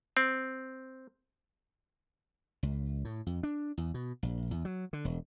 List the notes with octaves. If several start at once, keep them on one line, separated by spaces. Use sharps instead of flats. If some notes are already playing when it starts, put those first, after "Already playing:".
C4
C#2
A2
F2
D4
E2
B2
A#1
E2
F#3
D3
E1